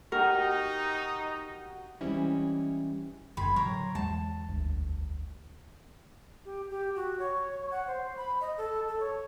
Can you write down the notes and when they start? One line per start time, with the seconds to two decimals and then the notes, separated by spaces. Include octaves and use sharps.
0.12 D#4 F#4 G4 A#4 G5
2.01 E3 G3 G#3 C4 C#4 E4
3.37 G1 F#2 D3 G5 B5 C6 G#6
3.56 A2 D3 F#3 A#4 C#5 A#5
3.95 E2 G#3 A5
4.48 G1 D2
6.45 G4
6.70 G4
6.96 F#4
7.19 C#5
7.71 F#5
7.87 C5
8.17 B5
8.41 D#5
8.58 A4
8.88 A4
9.00 C#5